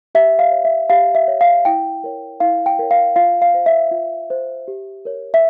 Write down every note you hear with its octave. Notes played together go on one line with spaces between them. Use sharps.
G4 E5
F5
C#5
E5
G4 F5
E5
C#5
F5
E4 G5
A#4 C#5
E4 F5
G5
A#4 C#5
F5
F4 F5
F5
C5
E5
F4
C5
G4
A#4 C#5
E5